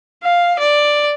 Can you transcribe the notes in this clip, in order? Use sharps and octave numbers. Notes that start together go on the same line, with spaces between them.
F5
D5